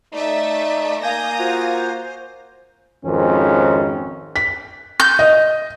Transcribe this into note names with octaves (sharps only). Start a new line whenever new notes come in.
A3 D#4 D5 E5
A#3 F5 G#5 A#5 D#6 G6 A#6
F4 F#4 C5 G#5
G#1 F2 D#3 C#4
B6
G6
D#5